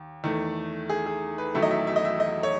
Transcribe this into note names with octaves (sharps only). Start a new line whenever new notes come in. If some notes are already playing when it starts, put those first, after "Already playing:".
Already playing: D#2
E2 D#3 A3
G#4
G#4
B4
E1 E2 D#3 F#3 A3 E5
D#5
E5
E5
D#5
E5
D#5
C#5